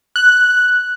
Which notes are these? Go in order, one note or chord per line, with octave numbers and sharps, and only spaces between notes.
F#6